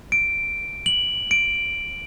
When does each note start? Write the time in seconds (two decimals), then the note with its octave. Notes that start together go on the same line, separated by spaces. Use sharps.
0.12 D7
0.86 F#7
1.31 D7